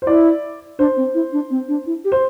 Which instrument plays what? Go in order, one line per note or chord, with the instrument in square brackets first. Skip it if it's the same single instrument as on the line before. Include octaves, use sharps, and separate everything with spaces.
[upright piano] C5
[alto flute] E4 [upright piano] D5
[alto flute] D4 [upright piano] C5
[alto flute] C4
E4
D4
C4
D4
E4
G4
[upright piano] C5